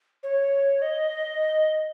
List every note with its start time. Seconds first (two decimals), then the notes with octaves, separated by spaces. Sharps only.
0.23 C#5
0.82 D#5